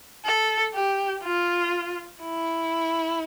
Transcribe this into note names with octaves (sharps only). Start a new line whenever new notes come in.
A4
G4
F4
E4